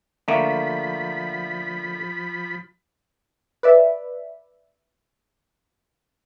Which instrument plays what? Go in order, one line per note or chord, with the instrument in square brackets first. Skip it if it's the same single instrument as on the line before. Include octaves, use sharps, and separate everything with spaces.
[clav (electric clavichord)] D3 A3 A#3 [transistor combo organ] F3 B5
[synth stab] B4 D5 E5